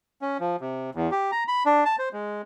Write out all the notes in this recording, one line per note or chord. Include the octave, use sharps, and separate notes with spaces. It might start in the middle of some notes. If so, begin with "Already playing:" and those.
C#4
F3
C3
E2
G4
A#5
B5
D4
A5
C5
G#3